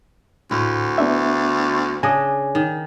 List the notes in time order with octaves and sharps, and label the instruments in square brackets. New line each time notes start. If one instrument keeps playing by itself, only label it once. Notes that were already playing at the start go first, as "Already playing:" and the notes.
[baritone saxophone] D2 [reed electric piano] A2 [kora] E4
[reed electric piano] B3 D4 E5
[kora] C#3 D4 D#5 [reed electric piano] G#5
[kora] D#3